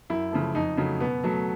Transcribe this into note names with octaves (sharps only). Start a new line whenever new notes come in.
F#2 E4
C#3 F3 A3
F2 D#4
C#3 F#3 A3
B2 B3
F#3 A3